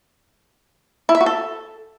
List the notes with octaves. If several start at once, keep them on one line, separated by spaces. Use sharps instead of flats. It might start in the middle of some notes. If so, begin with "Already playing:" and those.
E4
E5
F#4
A4